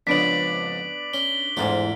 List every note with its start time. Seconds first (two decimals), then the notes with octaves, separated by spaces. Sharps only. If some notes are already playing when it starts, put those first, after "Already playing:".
0.07 F2 G#2 C#3 B3 D4 B6 D7 F#7
1.13 C#4 G7
1.57 E2 G#2 A3 C4 F4